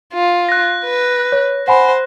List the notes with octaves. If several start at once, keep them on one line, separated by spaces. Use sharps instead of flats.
F4
F#6 A#6
B4
C#5
C5 F#5 G#5 B5